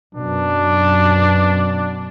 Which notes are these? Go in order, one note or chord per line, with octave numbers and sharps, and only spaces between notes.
F#2 B2 D4